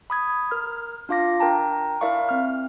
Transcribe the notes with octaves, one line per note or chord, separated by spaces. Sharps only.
B5 D#6 G#6
A#4 F6
D4 F4 F5 D6 A#6
D4 A#4 G5 A5 A#5
E4 A#4 D5 E5 F5 C#6
C4 F6